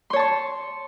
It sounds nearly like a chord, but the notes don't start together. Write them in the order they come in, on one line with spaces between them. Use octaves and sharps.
C6 C#5 A5 C#6